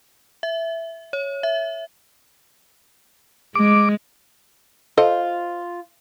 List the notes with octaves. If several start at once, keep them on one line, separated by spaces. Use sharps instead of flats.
E5
C#5
E5
G#3 D6
F4 A4 C5 D#5